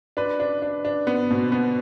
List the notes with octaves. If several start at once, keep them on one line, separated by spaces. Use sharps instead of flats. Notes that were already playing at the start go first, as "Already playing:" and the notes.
D4 B4
D4
D4
D4
B3
B2
B3